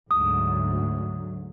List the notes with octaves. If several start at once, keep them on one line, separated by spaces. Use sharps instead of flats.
D2 G#2 F#3 D#6